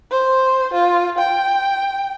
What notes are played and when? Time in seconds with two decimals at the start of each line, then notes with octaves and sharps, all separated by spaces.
0.11 C5
0.73 F4
1.18 G5